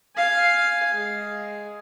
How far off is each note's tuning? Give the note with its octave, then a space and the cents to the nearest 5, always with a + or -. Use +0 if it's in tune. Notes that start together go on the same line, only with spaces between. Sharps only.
F5 +0 G#5 +0
G#3 +0 G#4 +0